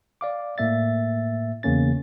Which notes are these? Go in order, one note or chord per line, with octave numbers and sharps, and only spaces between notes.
D5 F5 D6
A2 A#3 E5 A6
E2 C#3 A#3 C#4 A6